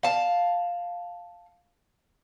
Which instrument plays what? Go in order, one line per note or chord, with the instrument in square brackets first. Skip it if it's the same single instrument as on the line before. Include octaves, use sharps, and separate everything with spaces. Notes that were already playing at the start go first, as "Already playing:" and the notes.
[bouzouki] F5 A5